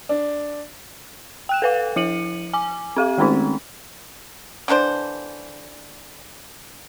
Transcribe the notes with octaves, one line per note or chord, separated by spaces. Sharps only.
D4
G5 F#6 E7
A4 B4 F5
F3 E4 C#7 D#7 F#7
G#5 D6
C4 G4 F5
D#3 G#3 A3 C4 C#4 D#4
D3 E3 D4 C5